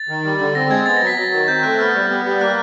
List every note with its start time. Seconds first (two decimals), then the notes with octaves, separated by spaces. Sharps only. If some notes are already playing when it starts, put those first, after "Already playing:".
Already playing: A6
0.09 D#3
0.25 G3
0.40 D3
0.55 C4 A#6
0.70 G#3 G#6
0.86 B3 A6
0.97 F#3 A#6
1.07 B6
1.17 F#3 A#6
1.32 D#3
1.48 C4 G6
1.63 A3 F#6
1.79 B3 F6
1.95 G3
2.10 B3
2.25 G3
2.41 A#3 F#6